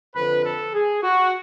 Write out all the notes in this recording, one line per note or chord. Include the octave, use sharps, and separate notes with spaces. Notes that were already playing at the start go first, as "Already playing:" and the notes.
F2 D3 F3 B4
A4
G#4
F#4